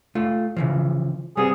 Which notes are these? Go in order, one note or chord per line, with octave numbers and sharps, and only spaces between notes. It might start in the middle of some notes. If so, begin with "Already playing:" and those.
A3 F4
C#3 E3 F3
G3 B3 C4 G#4